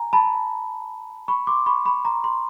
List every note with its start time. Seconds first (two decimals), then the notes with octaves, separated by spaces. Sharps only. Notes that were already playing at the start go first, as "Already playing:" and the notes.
Already playing: G#5 A#5
0.13 A5 B5
1.28 B5 C#6
1.47 C6 D6
1.66 B5 C#6
1.85 B5 C#6
2.05 A#5 C6
2.24 A#5 C6